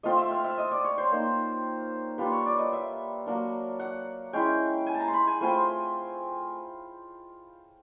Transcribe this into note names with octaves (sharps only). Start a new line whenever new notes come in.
A3 C4 F4 D#5
E5
F5
E5
D#5
D5
C#5
C5
A#3 D#4
G3 A#3 D4 F4 B4
C#5
D5
D#5
E5
F#3 A#3 D4
F#5
G#3 C#4 E4 G5
G#5
A5
A#5
C6
B5
G#5
A3 C4 F4 G#5